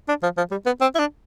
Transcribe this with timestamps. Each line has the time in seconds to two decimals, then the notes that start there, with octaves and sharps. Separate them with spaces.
0.09 D4
0.23 F3
0.37 F3
0.51 G3
0.66 B3
0.81 C4
0.95 E4
0.99 D4